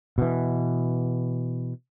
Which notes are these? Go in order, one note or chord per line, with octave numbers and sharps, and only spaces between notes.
B2 E3